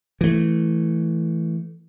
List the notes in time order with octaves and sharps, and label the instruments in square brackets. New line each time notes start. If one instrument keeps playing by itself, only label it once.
[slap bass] E3 A3